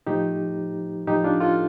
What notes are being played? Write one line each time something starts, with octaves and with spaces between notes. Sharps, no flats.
A2 F3 A3 D#4 G4
A2 F3 A3 D#4 G4
D4 F4
F4 A4